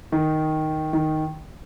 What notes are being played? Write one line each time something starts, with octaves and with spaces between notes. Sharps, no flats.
D#3
D#3